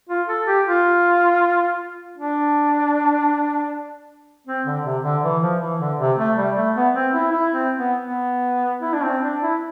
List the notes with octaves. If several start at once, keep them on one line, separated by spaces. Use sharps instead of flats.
F4
A4
G4
F4
D4
C4
D3
C3
D3
E3
F3
E3
D3
C3
A3
G3
A3
B3
C4
E4
E4
C4
B3
B3
E4
D4
C4
D4
E4